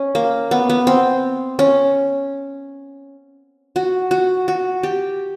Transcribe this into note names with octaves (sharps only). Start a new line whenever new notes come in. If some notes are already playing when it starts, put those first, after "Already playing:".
Already playing: C#4
A#3
B3
B3
C4
C#4
F#4
F#4
F#4
G4